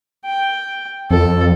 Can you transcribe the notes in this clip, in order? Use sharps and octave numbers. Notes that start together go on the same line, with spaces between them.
G5
F2 A4